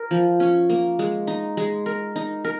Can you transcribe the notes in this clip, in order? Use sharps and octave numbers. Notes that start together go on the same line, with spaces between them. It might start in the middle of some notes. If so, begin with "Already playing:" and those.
Already playing: A#4
F3
C#4
A#3
G#3
D#4
G#3
A#4
D#4
A#4